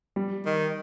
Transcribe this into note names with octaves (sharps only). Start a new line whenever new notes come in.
G3
D#3